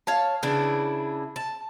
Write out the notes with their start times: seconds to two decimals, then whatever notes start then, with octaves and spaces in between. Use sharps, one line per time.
0.07 C#5 F5 A5
0.43 C#3 E3 D4 E4
1.36 A5